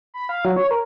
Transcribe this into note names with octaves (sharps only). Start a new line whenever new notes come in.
B5
F5
F#3
C#5
A#4